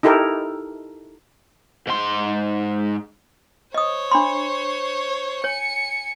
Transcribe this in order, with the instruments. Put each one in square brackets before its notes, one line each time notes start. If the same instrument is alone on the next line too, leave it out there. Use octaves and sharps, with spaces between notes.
[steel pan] D#4 E4 G4 A4 A#4
[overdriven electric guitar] G#2 C6
[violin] C5 C#5 [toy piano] D#5 D#6
[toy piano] D4 B5 C6
[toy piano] C#5 [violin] G#5 C#7